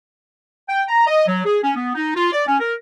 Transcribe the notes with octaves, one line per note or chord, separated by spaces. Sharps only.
G5
A#5
D#5
F#3
G#4
C#4
B3
D#4
F4
D5
C#4
A#4